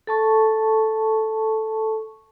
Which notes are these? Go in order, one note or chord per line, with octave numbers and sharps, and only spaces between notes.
A4 A5 C#6